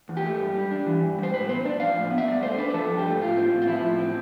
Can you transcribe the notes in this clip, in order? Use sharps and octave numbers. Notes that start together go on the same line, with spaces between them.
E2
G4
A3
G2
G3
D4
E3
G2
G3 C5
A2 B4
B3 C5
D4 D5
F3 F5
A2
B3
E5
G2 D5
A3 C5
D4 B4
B4
F3 A4
G2
G4
A3
A2 F4
C4
A2
F4
F3 E4
A2
C4